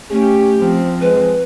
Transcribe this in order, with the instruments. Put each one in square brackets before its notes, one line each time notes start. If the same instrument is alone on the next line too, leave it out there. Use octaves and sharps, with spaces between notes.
[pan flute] A3 [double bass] C#4 [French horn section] G4
[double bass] F3 C4
[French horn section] G#3 [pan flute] B4